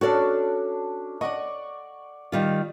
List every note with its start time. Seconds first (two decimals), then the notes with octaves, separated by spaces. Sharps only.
0.01 C#4 D4 F#4 A4 D5
1.21 D5 D#5 F#5 C#6
2.32 D#3 G3 F4